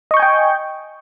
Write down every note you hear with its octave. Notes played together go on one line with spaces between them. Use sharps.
D#5 G5 G#5 C#6 G6